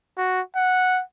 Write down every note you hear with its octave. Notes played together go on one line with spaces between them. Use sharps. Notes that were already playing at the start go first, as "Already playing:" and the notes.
F#4
F#5